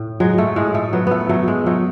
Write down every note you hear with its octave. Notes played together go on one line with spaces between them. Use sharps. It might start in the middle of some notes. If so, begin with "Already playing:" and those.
Already playing: A2 A3
F#3 G#3
A3
A2 G#3
A3
F#3 B3
A3 B3
F#3 A3
G#3
F#3 A3